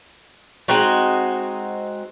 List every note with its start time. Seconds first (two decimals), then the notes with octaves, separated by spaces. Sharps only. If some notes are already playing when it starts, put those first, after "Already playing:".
0.68 G#3 C4 D#4 F#4